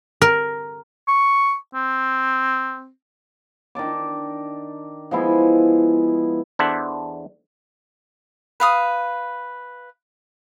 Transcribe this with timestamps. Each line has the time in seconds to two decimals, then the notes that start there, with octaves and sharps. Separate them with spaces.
0.22 A#4
1.08 C#6
1.75 C4
3.75 D#3 D4 A5 D6
5.11 F3 G#3 B3 E4
6.59 E2 D4 A4 C5 E5 F#5
8.60 B4 F5 D#6